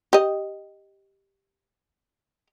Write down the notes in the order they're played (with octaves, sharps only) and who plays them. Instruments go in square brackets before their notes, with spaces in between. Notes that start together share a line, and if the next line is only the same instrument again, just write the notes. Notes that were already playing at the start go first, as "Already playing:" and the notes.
[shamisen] G4 D#5